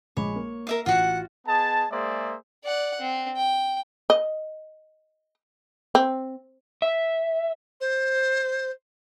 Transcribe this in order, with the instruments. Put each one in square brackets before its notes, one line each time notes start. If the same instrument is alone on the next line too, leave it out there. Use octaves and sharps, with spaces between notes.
[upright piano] A#1 G#3 B5 [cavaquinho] C#5
[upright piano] A#3
[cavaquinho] A#4 E5 F5
[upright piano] A1 [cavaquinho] F4 F#4 [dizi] F#5
[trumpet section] B3 G#4 D#5 A5
G#3 A#3 G#4 C5 D5 E5
[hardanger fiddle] D5 F#5
C4
G5
[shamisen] D#5
C4
[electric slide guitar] E5
[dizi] C5